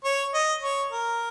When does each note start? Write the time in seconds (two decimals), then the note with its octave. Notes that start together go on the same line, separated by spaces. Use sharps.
0.05 C#5
0.34 D#5
0.63 C#5
0.92 A#4